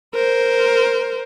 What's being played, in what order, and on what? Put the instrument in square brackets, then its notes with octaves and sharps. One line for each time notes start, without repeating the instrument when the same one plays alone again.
[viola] A#4 C5